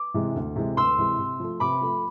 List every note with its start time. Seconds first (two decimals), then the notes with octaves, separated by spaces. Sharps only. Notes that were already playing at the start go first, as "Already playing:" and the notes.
Already playing: D6
0.14 C3 E3 G#3
0.36 D2
0.56 C3 E3 G#3
0.77 D2 C6 E6
0.98 C3 E3 G#3
1.19 C3
1.40 F3 A3
1.60 C3 B5 D6
1.81 F3 A3